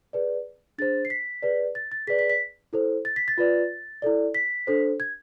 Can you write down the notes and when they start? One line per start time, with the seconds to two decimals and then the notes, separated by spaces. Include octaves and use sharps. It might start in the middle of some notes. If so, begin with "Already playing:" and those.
0.13 G#4 B4 D5
0.78 D4 G#4 C5 A6
1.05 C7
1.10 B6
1.43 G#4 B4 D5
1.75 A6
1.92 A6
2.07 G#4 B4 D5 B6
2.19 B6
2.30 B6
2.73 E4 A4 C5
3.05 A6
3.16 B6
3.28 A6
3.38 F4 B4 D5
4.02 E4 A4 D5
4.34 B6
4.67 D4 A4 C5
5.00 G#6